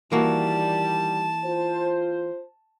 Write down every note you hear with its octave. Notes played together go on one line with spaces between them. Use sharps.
D#3 E3 G3 A#3 F#4 A5
F4 C5